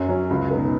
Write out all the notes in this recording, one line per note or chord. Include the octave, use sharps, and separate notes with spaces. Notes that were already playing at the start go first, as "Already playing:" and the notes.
Already playing: F#2
F#3 C#4
C#2
B2 B3 D#4 B4